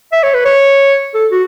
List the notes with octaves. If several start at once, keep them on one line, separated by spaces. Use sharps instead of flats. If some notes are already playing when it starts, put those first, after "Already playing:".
E5
C#5
B4
C#5
A4
F#4